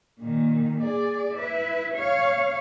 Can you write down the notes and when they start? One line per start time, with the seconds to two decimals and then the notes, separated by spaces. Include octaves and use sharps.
0.20 A#2 D#3
0.80 G#4 D5
1.33 E4 B4
1.94 C#5 F5